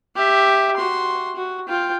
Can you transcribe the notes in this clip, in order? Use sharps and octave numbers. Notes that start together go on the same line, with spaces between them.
G4 E5
F#4 C6
F#4
F4 G5